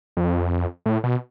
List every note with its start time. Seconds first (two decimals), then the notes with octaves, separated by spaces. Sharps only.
0.17 F2
0.86 A2
1.04 B2